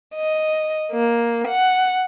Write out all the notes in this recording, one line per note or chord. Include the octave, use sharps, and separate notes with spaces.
D#5
A#3
F#5